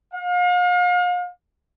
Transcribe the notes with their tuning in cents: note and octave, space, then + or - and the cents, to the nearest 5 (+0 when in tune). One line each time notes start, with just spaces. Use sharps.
F5 +40